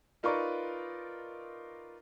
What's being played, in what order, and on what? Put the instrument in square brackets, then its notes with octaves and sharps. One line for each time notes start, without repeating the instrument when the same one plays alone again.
[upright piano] D#4 F4 A#4 B4 D5 C#6